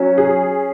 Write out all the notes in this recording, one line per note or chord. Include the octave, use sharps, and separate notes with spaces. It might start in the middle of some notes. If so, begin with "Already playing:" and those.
Already playing: F#3 C#4
G#4